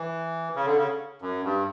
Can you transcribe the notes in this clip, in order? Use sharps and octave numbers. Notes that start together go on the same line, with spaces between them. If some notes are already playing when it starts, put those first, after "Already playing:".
Already playing: E3
C#3
D3
C#3
F#2
G2